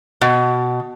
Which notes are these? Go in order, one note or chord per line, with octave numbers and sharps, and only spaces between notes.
B2